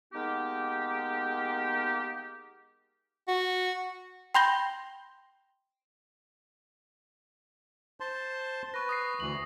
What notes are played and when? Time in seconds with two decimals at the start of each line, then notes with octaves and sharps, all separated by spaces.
0.13 G#3 A#3 B3 D#4 G4
3.28 F#4
4.34 G5 B5 C6 G6 A#6 G7
8.00 C5 A5 C6
8.74 B4 C#6 A#6
8.89 D#6 A#6 C7
9.20 D2 E3 F#7